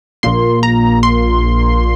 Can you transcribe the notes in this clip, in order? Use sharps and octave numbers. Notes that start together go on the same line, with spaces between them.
A#1 A#2 A#3 C6
A#5
C6